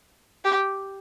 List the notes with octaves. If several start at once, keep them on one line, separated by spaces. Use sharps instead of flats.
G4